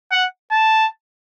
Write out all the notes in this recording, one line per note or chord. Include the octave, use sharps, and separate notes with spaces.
F#5
A5